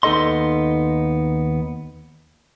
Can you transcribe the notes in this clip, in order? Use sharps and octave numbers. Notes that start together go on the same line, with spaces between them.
D#2 B3 D#4 A4 D#5 C6